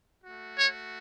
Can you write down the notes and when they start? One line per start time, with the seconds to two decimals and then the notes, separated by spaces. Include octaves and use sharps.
0.24 A3 F#4
0.58 C#5